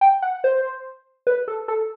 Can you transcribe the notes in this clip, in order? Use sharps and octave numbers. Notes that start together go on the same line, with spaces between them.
G5
F#5
C5
B4
A4
A4